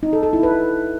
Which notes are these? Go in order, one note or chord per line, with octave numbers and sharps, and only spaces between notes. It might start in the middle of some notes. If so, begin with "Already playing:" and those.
D#4
A4
A4
E4
B4